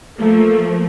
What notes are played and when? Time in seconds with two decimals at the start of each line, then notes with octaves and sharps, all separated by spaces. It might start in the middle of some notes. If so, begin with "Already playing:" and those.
0.18 F3 A3 A#3